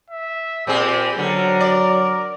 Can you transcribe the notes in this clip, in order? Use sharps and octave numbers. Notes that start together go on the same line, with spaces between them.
E5
A#2 C4 G4 G#4
D3 F#3 A#4
D5